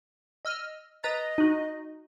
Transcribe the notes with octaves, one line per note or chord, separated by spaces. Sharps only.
D#5 E6 F6
B4 D#5 A#5 A6
D#4 F#4